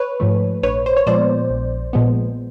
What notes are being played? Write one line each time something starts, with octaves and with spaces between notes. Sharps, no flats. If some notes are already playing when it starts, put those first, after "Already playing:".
Already playing: B4 C#5
G#2 F3 A3
A#1 B4 C#5
C5
C#5
A#2 F3 G#3 B3 C5 D5
A#1
A#2 F3 G#3 B3